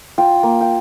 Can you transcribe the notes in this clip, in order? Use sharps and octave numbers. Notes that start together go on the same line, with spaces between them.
F4 G5
A#3
G5